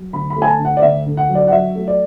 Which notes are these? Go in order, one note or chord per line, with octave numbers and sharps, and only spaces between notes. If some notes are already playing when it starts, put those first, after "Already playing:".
Already playing: F#3
D2 B5
B5
A3
G#5
A5
D3
F#5
D5
D2 E5
D3
F#5
F#3
D5
F#5
F#3 E5
A3
D5